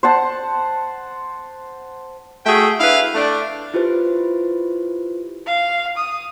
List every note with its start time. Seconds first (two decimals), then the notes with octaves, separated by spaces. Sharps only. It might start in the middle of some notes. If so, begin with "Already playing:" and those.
0.03 C5 F#5 A5
2.46 A3 F#4 G#4 E5 G5
2.80 D4 E4 B4 E5 F5
3.15 A3 D4
3.74 E4 F4 G4 B4 C5
5.46 F5
5.97 D#6